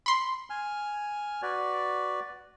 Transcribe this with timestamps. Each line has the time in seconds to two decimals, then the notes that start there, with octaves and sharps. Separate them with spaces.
0.06 B5 C6
0.50 G#5 F6
1.42 F#4 B4 D5